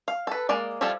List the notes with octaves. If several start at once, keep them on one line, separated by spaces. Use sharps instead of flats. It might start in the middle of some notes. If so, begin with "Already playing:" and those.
F5
A4 B4
G#3 A#3 D5
F3 G3 E4 F4 A4